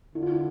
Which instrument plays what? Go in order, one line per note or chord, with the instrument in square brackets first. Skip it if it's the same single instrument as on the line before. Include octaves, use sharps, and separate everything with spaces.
[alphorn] D3 [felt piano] E4
[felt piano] F4
E4